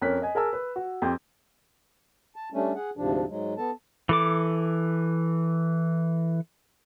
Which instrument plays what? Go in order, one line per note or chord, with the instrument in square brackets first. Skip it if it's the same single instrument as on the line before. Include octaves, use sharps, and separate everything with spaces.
[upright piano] F2 C#4 A#4 F#6 B6
D#5 G#5
G#4 A#4 G#5 A5 E6
B4
F#4
F2 G4 C6 G6
[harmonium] A5
G3 A3 C#4 D4
G#4 F#5
D2 G#2 C3 F3 D4
G#2 F#3 G#3
B3 A4 A5
[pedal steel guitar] E3 A4 D6